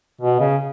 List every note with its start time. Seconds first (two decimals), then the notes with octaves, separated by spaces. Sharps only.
0.21 B2
0.40 C#3